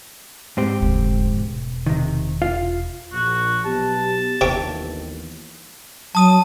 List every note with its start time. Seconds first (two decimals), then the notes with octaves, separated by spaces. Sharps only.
0.57 G#2 C4 G4
0.80 F1 D2
1.37 E1
1.86 C3 D#3
2.42 F4 F5
3.12 A#1 F#4
3.65 B1 B3 G4 A5
4.41 G1 D#2 C3 E3 C#5 G5
6.15 F#3 A5 D#6 D#7